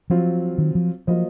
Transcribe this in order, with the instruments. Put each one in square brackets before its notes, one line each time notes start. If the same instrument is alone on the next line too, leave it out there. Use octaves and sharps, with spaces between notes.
[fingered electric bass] F3 [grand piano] F#3 C4 F4
[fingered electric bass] D#3
F3
[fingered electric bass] F3 [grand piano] F#3 A#3 F4 C5 D#5